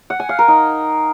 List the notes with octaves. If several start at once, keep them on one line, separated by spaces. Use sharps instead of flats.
F#5
G#5
F5
A#4
D#4